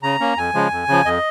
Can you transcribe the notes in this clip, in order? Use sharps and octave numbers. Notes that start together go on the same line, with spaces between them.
C#3 A#5
A#3 C#4
F2 G#5
C#3 F3 G#3
F2
C#3 F3
F2 D#5